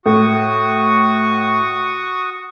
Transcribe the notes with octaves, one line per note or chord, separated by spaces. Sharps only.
A2 F#4 C#6 D#6